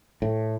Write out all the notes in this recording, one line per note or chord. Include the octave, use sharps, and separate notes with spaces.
A2